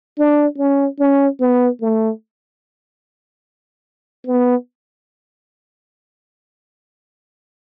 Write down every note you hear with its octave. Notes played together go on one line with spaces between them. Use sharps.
D4
C#4
C#4
B3
A3
B3